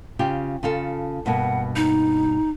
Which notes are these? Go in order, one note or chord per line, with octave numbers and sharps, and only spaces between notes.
C#3 F4 G4
C#3 F4 A4
G2 B2 A#3 F#5
D#4